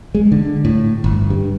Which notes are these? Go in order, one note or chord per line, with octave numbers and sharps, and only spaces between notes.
G#3
D3
A2
G1
G2